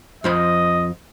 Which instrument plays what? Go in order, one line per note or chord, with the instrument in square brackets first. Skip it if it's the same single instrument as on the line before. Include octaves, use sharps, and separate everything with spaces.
[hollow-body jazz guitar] F2 F3 B5 [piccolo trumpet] D#5